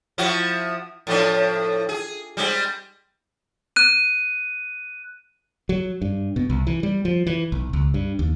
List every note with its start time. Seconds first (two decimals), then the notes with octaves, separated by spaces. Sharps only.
0.18 F3 E4 F#4
1.07 A2 F3 D4
1.89 G#4
2.37 G3 G#3 C4
3.76 F#6 D#7
5.69 F#3
6.02 G2
6.36 B2
6.50 C2
6.67 E3
6.83 G3
7.05 F3
7.27 E3
7.52 B1
7.73 C#2
7.94 G2
8.19 D#2